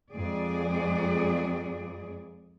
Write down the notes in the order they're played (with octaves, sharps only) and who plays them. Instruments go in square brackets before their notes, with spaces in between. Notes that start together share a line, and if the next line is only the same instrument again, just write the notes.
[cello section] F2 G#3 G#4 D5